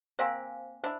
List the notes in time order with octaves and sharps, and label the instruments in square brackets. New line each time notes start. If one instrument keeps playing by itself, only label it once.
[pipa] A#3 C4 [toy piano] C5 F5 G#5
[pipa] D4 E4 [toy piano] C5